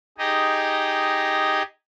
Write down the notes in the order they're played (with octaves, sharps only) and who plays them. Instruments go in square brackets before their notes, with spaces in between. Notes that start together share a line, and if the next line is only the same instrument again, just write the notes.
[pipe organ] D#4 G4 G#4 D#5